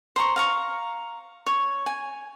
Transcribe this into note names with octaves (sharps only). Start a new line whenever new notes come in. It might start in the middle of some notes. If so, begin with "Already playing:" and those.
C5 A#5 C#6
F5 A#5 C#6
C#5
G#5